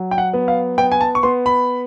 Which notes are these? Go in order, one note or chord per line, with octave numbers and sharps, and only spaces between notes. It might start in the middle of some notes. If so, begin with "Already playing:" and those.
Already playing: F#3
G5
F#5
B3
F5
B3 G5
G#5
A5
C#6
B3 C6
B5